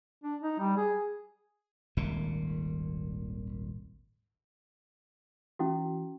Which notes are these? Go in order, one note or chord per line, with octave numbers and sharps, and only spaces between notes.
D4
D#4
G3
G#4
D#1 G#1 A#2
E3 C#4 E4 F#4